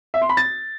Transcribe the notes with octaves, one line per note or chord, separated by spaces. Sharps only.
E5
C6
B5
A6